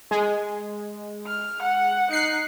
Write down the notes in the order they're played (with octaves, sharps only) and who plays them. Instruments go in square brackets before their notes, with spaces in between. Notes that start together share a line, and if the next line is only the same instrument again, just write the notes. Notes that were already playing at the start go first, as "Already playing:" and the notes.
[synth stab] G#3
[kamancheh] F6
F#5
[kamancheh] D#4 [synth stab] F#6 C7 C#7